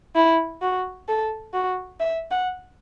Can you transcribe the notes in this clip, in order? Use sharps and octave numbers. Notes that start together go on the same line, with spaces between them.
E4
F#4
A4
F#4
E5
F#5